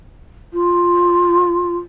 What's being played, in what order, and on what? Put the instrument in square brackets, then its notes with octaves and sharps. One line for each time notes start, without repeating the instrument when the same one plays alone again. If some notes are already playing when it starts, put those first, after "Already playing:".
[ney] F4